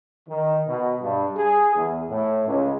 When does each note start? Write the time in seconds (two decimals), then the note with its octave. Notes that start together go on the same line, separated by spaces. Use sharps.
0.28 D#3
0.67 B2
1.01 G2
1.36 G#4
1.75 E2
2.09 A2
2.46 C#2